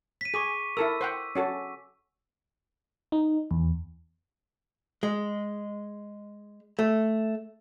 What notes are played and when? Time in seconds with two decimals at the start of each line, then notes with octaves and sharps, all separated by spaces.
0.21 B6 D#7
0.34 G#4 C#6 D6 D#7
0.77 E4 A4 A#4 E6
1.01 C5 F#5 G5
1.36 C#4 F#4 A4
3.12 D#4
3.51 E2
5.03 G#3
6.79 A3